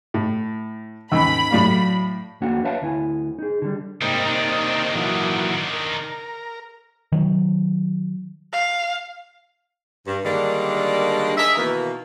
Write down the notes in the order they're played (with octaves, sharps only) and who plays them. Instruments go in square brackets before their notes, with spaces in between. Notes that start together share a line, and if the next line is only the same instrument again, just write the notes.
[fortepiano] A2
[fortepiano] D#2 G#2 [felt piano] C#4 E6 [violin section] B5
[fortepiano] A2 D5 F5 [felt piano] F#3 A3
[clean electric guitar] F2 A#3 D4 F#4 F#5
B4 C#5 E5 F5 A5
D2 E4 G#5
D#4 G#4
D3 G3
[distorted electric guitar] G#2 G3 [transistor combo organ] C3 A#3 D#4
[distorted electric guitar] D#3 D4
[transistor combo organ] A#2 E3 F#3
A#4
[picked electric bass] D#3 F#3
[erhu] F5
[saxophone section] G2
D3 D#3 G3 G#3 A#3 D4
G#4 A#4 D#5 E5
B2 D#3 E3 A#3